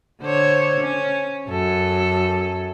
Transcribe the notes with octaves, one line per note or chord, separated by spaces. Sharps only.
D3 C5 C#5
C#4
F#2 A4